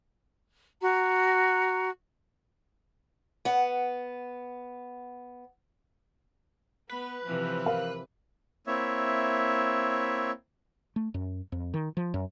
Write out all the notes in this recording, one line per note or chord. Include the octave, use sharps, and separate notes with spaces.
F#4 A#5
B3 F#5
B3 B4
C3 E3 F3
A#4 F5
A#3 C4 E4 C#5 E5
A3
F#2
F2
D#3
F3
F#2